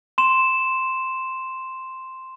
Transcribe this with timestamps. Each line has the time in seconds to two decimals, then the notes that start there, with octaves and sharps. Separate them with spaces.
0.18 C6 E7